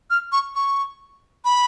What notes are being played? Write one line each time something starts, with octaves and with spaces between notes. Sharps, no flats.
F6
C#6
C#6
B5